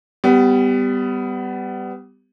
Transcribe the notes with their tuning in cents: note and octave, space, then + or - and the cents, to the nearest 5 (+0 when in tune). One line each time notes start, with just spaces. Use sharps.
G3 +0 B3 +20